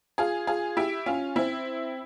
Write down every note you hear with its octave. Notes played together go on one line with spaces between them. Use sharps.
F4 G#4
F4 G#4
E4 G4
C#4 F4
C4 E4